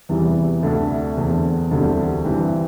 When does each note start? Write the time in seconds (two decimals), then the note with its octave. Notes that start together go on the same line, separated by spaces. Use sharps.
0.09 E2 C3 E3 G3
0.63 D2 C3 A3 D4
1.17 E2 D3 C4
1.71 E1 D2 D3 G3 C4
2.25 G2 E3 C4 G4